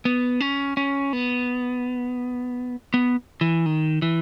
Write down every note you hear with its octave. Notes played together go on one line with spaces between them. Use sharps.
B3
C#4
C#4
B3
B3
E3
D#3
E3